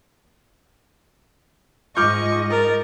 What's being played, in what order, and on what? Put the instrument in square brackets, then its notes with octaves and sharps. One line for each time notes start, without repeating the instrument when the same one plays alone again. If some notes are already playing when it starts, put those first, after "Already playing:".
[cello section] G#2 D#5 [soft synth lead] F4 [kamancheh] C#6 [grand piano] D6 F6 G6
[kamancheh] A#4 [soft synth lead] A6